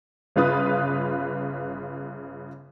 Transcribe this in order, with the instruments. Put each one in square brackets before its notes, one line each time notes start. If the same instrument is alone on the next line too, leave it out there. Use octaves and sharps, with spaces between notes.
[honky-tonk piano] G1 C#3 F4 B4 D#6